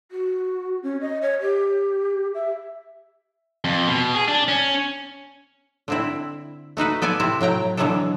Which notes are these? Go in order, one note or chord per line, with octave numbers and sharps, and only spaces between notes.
F#4
C#4
D#5
C#5
G4
E5
F2
B2
G#4
D4
C#4
D3 C4 E4
A3 D#4 F#4 B4
B3 A4 D5 G#5
C3 C4 E4
A2 F#3 G5 A#5
B2 D3 E3 F#3 B3 A4